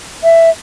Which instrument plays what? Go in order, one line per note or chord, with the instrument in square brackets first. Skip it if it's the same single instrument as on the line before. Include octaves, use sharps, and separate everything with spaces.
[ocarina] E5